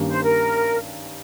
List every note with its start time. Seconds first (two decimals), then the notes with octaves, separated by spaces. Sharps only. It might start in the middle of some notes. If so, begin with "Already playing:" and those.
Already playing: G2 D#3 A#3 C#4
0.09 C5
0.23 A#4